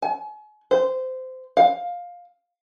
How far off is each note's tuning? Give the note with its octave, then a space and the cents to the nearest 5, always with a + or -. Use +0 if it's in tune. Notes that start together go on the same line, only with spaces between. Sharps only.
G#5 +40
C5 -20
F5 +15